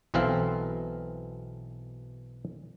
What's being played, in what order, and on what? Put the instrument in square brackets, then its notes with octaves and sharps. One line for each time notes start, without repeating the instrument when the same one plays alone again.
[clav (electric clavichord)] B1 B2 E3 C4 A4 F5